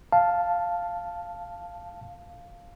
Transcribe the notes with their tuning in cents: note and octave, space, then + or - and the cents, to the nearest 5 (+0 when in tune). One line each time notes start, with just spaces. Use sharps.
F5 +0 A5 +0